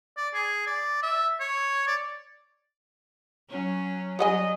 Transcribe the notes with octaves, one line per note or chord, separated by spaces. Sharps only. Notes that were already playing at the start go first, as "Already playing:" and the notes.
D5
G#4
D5
E5
C#5
D5
F#3 C#4
F#3 G3 D#5 F#5 G#5